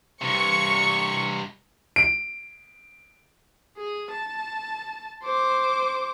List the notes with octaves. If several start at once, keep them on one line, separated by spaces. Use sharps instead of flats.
G2 C3 C#6
D7
G#4
A5
C5 D6